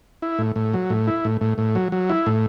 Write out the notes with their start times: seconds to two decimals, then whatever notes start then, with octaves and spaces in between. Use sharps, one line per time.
0.22 E4
0.39 A2
0.56 A2
0.74 F#3
0.90 A2
1.07 E4
1.25 A2
1.41 A2
1.58 A2
1.75 F#3
1.92 F#3
2.09 E4
2.26 A2